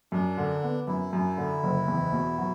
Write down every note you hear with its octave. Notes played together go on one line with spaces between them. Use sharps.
F#2 D4
D3
B3
F#2 E4
F#2
D3
F#1
E2
B2
F#3